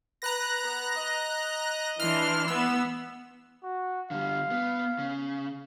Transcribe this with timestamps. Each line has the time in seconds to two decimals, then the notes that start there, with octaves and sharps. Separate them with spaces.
0.22 B4 A#5 F#6 A#6
0.63 B3
0.96 D#5
2.00 E3 D4 C6 F6
2.48 B3 E6
3.63 F#4
4.11 D3 G3 F5
4.51 B3
4.99 C#3